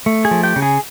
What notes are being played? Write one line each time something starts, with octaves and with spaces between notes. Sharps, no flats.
A3
G#4 G#5
F3
G4 G5
C#3
G#4 G#5